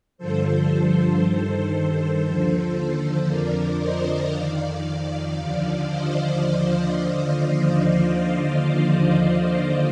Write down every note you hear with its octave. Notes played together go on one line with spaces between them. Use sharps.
G2 D3 F3 A4 C5
G2 D#3 A4 C5
D#2 D3 F3 A4 C5
A4 C5
F2 D3 F3 A#4 D5
C5 D#5
F2 D#3 D5 F5
D#2 D3 F3
C5 D#5